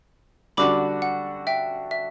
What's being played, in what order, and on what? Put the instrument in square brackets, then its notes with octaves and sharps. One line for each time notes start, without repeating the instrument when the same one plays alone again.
[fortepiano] D3 G3 D4 F#4 [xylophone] B5 D6
[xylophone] F#5
E5 G5
E5